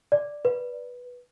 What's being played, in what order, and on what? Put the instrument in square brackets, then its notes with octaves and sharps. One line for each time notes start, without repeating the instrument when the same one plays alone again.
[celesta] D5
B4